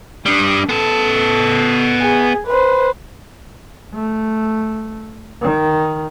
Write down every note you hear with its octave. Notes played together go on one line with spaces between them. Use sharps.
G3 D4 D#6
B3 A4 A5
G#4
B4 C5
A3
D#3